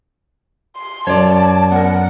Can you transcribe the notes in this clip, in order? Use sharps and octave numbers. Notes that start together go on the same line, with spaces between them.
C6
F#2 C#5 D5 A5
B3 A#4 F#5